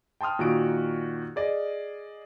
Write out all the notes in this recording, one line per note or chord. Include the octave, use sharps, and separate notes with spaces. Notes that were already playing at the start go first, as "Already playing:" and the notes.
G5 A5 C6 D#6 F6
A#2 D#3 F#4 D#6 D7
G#4 D5 D#5